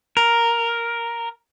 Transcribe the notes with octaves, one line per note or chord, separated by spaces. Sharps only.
A#4